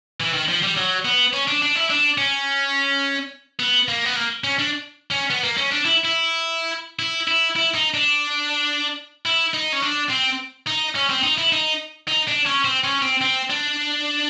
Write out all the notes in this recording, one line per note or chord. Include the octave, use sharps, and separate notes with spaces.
E3
D#3
F3
G3
F#3
B3
C#4
D4
D4
E4
D4
C#4
B3
A#3
B3
A#3
C#4
D4
C#4
B3
A#3
C#4
D4
E4
E4
E4
E4
E4
D#4
D4
E4
D#4
C#4
D4
C4
D#4
C#4
C4
D#4
E4
D#4
D#4
D4
C#4
C4
C#4
C4
C4
D4